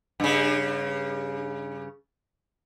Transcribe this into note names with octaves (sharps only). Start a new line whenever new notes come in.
G2 C#3